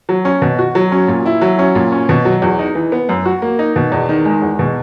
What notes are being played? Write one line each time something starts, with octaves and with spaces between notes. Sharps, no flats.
F#3
C#4
B2
F#4
F#3
C#4
A#2
E4
F#3
C#4
A#2
C#4
B2
F#3
E2
D#4
E3
B3
F#2
F#4
A#3
D#4
B2
E2
D#3
G#3
E2
B2